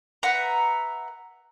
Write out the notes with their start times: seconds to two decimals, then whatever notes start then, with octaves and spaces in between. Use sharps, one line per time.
0.23 B4 E5 F#5 A#5